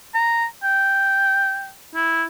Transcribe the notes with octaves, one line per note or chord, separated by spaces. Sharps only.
A#5
G5
E4